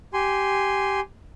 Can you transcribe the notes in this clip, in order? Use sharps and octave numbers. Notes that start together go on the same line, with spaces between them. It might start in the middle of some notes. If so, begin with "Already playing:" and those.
G4 G#5 C6